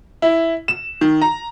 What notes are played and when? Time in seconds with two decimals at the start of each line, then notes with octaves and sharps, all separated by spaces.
0.22 E4
0.68 E7
1.01 D#3
1.22 A#5